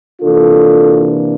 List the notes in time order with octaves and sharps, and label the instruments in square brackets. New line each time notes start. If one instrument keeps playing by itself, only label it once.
[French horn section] C3 E3 A#3 D4 F4 A4